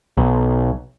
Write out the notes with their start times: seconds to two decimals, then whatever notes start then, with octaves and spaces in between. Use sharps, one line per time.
0.17 B1